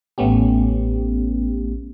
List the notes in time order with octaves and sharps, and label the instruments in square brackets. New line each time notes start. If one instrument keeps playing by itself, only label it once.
[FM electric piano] A1 A3 B3 C#4 G4